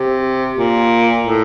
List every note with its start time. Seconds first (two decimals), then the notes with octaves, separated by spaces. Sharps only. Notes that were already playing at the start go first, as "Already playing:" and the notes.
Already playing: C3
0.56 A#2
1.23 A2